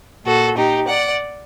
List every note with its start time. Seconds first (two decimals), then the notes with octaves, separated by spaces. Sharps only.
0.25 A#2 F#4 A4
0.57 D#4 G4
0.88 D5 F#5